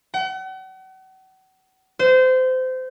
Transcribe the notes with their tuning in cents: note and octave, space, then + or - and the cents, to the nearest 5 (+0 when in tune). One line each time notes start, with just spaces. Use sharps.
F#5 +40
C5 -25